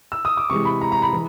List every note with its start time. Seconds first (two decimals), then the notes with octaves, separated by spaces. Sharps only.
0.12 E6
0.25 D#6
0.37 D6
0.50 C3 E3 G#3 C#6
0.65 B5
0.81 A#5
0.92 A#5
1.02 B5
1.13 E3